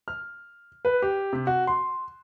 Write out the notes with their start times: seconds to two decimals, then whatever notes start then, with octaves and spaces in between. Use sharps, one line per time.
0.08 F6
0.85 B4
1.02 G4
1.33 C3
1.47 F#4
1.67 C6